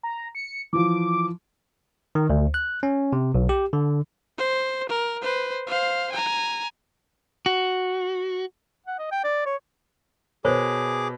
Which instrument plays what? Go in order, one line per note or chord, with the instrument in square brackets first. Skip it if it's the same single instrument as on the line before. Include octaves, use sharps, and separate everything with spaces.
[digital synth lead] A#5
C#7
[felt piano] E3 F3 [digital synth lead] D6
[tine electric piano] D#3
D2
F#6
C#4
C3
B1
G4
D3
[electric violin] C5
A#4
B4 C5
C5 F5
G#5 A#5
[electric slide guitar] F#4
[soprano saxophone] F#5
D#5
G5
D5
C#5
[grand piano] B2 [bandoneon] G#4 D6 [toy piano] A#4 C5 C#5